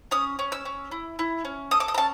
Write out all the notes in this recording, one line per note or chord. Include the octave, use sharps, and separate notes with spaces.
C#4 D#6
C#4
E6
C#4
E4
E4
C#4
A4 D#6
D6
D#6
A#5
C#4 A5